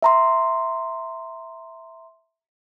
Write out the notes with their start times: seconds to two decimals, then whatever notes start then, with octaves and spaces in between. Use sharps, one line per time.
0.02 E5 A#5 C6